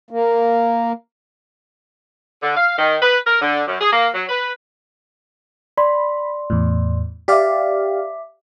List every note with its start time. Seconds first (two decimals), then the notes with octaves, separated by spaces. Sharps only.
0.11 A#3
2.42 D3
2.57 F5
2.79 D#3
3.02 B4
3.27 A#4
3.42 D3
3.68 F#2
3.81 G#4
3.92 A#3
4.14 F#3
4.29 B4
5.78 D5 B5 C6
6.50 E2 A2
7.28 G4 D5 E5 F5 D6 B6